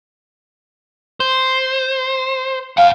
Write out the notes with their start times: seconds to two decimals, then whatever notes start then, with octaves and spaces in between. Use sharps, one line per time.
1.20 C5
2.77 F5 F#5 G#5